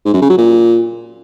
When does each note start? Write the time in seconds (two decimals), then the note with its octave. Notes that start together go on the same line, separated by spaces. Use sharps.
0.05 G#2
0.13 F#2
0.22 C#3
0.30 F#3
0.38 A#2